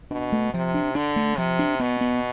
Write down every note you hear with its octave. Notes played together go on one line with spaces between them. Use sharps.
B2 D4
A3
C3 F3
D4
D3 D4
A3
C3 F3
D4
B2 B3
B3